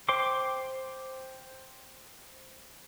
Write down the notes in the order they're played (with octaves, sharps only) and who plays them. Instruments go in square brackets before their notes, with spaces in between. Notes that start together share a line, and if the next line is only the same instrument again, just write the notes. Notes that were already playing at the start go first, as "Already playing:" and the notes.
[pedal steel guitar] C5 G5 C6 D6